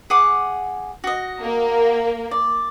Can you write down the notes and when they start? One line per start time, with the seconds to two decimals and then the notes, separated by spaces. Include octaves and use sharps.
0.10 G#4 F#5 D6
1.04 F#4 D#5
1.43 A#3
2.31 D5